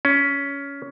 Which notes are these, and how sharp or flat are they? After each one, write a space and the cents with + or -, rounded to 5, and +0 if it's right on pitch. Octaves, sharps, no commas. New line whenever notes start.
C#4 +15